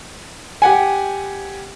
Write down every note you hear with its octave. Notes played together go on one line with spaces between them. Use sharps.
G4 F#5 G#5